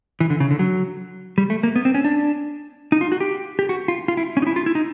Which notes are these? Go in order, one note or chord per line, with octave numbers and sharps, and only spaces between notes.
E3
D3
C#3
D3
F#3
G3
A3
A#3
B3
C4
C#4
D4
D#4
F4
F#4
G4
G4
F#4
F4
F4
E4
C#4
D#4
E4
F4
E4
D#4